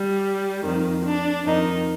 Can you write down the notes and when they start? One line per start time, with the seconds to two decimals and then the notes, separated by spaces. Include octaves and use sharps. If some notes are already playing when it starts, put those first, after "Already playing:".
Already playing: G3
0.64 F2 D#3
1.05 D4
1.46 F2 D#3 D#4